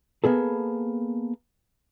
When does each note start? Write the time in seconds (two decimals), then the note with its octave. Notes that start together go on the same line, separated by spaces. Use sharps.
0.24 A#3 B3 G#4 A4